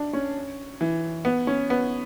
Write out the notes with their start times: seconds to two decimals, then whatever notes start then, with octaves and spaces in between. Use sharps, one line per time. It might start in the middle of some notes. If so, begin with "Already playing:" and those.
Already playing: D4
0.13 C#4
0.81 E3
1.25 B3
1.47 C#4
1.70 B3